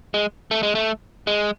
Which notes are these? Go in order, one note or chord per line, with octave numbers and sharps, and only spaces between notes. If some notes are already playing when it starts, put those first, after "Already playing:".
G#3
A3
G#3
A3
G#3